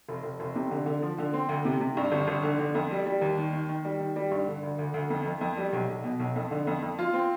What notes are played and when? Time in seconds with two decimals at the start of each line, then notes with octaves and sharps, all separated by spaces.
0.09 F1
0.23 F1
0.40 F1
0.56 C3
0.71 D3
0.86 D3
1.02 F3
1.18 D3
1.33 C4
1.49 D2
1.65 C3
1.81 C3
1.97 G2
2.12 G1
2.28 G1
2.43 D3
2.59 D3
2.75 F2
2.91 G3
3.06 G3
3.21 D#2
3.37 D#3
3.53 D#3
3.69 D#3
3.85 G3
4.00 D#3
4.16 G3
4.31 G2
4.47 D3
4.63 D2
4.78 D2
4.94 D2
5.10 F2
5.26 F2
5.41 F2
5.57 G3
5.73 B1
5.88 B1
6.04 B2
6.19 B1
6.36 F2
6.51 D3
6.67 F2
6.82 F2
6.99 F4
7.14 C4